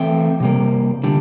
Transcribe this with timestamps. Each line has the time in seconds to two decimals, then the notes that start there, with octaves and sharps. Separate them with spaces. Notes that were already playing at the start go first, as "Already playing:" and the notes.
Already playing: E3 A3 C4 E5 G5
0.40 C3 G3 A#3
1.03 D3 G3